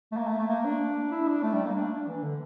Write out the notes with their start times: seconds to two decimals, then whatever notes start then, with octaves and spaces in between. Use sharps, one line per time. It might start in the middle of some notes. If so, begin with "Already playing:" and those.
0.12 A3
0.17 A#3
0.27 A3
0.38 A3
0.48 A#3
0.64 D4
1.11 E4
1.27 D4
1.43 A3
1.53 G3
1.65 A#3
1.75 D4
1.92 D4
2.07 E3
2.23 D3